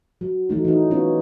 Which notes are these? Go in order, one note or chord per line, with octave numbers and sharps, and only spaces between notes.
F#3
E3 F#3 A3 D#4
E3 D#4
F#3 A3 B3 C#4 F4 C#5